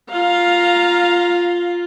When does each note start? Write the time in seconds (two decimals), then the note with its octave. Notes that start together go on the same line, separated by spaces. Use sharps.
0.12 F4 F5 A#5